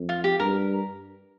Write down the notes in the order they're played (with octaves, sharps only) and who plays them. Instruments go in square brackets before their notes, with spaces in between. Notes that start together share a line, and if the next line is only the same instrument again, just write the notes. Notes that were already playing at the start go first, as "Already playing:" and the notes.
Already playing: [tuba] F2
[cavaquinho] F4
G4
[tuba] G2 [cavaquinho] A#4